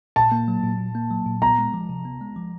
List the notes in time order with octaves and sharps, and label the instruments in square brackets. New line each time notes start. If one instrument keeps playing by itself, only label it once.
[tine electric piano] A#2 [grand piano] A5
[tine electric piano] A#3
F#3
A#2
A#2
A#3
F#3
A#2
[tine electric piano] B3 [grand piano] A#5
[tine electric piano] G#3
F3
C3
B3
G#3
F3